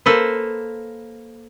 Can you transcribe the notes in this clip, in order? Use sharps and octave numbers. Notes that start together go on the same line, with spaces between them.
A#3 A4 B4 C5